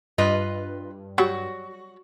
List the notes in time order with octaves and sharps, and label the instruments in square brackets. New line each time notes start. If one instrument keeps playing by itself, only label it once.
[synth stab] G2 [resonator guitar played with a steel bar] F4 B4 D#5
[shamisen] F#3 G3 [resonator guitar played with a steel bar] F#4